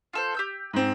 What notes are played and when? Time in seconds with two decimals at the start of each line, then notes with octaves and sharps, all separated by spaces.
0.13 F4 A4 C5
0.35 G4 E6 G6
0.73 G#2 C4